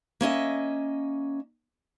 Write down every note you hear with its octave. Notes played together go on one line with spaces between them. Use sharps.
A#3 C#4 D#5 E5